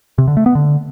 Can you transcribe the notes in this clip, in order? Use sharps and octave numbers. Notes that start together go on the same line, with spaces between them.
C3
D3
A3
B3
D3